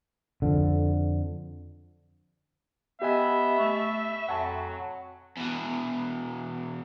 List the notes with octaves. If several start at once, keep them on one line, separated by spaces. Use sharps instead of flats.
F2 D3
B3 G4 D#5 E5 G#5
A3 B5 C#6
F2 F#3 F#5 G#5 A5
E2 B2